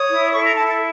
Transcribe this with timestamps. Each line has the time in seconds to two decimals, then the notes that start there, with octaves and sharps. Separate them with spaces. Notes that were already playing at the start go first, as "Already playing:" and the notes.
Already playing: C#5 D#6
0.10 E4
0.33 A4 C#6
0.45 A#5
0.56 E4 A5
0.67 A5